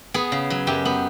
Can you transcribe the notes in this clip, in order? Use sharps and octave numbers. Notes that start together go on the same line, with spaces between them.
B3 G#4
C#3
F#3
F#2 G4
B3